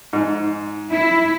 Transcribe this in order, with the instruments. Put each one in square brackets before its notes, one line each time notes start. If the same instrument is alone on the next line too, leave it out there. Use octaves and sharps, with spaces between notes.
[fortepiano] G#2
[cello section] E4